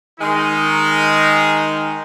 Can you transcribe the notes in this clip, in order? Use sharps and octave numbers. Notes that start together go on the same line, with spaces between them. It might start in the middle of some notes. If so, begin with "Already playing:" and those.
D#3 G#3 D#4